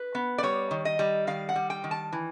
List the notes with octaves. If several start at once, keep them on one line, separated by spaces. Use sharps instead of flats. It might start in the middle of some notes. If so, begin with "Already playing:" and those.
Already playing: B4
B3
D5
G3 C#5
D#3
D#5
G3
D#3 F5
F#5
G3
G5
D#3
A5
E3